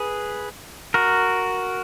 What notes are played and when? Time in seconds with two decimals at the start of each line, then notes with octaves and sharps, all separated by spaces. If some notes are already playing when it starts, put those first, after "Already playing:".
Already playing: G#4 B4
0.94 F#4 A#4